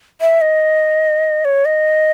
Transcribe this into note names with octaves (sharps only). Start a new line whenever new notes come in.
E5
D#5
C#5
D#5